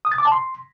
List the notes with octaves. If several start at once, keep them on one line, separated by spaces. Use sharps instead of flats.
D#6
A6
D6
A5
C6